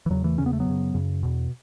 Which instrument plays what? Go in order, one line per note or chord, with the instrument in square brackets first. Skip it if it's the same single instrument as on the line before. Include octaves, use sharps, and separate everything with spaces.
[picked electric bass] E3
E2 C#3 F#3
E3 A3
E2 C#3 C#4
B3
A3
F#3 B3
F#2 C#3
F#2 C#3
E2 B2